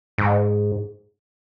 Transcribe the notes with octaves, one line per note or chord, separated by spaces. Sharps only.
G#2